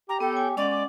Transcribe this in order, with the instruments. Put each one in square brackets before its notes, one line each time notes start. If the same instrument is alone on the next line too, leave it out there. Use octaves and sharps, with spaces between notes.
[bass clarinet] G4 [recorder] A#5
[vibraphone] B3 [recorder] A4 [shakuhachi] G5
[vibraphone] C#5 G#5
[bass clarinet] G#3 [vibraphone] C#4 D#5 F#5 [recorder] D5 [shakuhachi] D6
[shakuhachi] D6